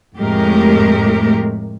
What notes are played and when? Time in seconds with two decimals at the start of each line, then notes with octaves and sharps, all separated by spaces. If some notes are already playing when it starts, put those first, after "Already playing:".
0.17 F2 A2 G#3 A3 G4 A#4